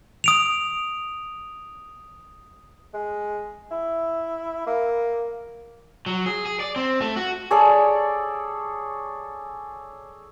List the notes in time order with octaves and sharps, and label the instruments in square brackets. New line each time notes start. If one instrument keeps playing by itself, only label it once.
[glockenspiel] D#6 D7 F7
[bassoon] G#3
E4
A#3
[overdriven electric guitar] F#3
G#4
G#4
D5
C4
A3
F#4
[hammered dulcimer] G#4 A4 C#5 D5